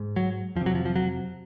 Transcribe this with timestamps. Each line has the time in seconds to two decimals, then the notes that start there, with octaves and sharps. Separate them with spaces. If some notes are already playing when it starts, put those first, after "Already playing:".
Already playing: G#2
0.16 F#3
0.55 F2 F3
0.61 C3
0.66 F#3
0.75 F3
0.85 F3
0.96 F#3